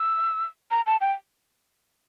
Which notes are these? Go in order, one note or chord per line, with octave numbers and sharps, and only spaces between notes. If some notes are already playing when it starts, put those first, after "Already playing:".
Already playing: E6
A#5
A5
G5